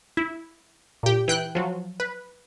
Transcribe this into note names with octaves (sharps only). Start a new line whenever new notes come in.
E4
A#2 G4
E3 G5 F#6
F3 F#3
B4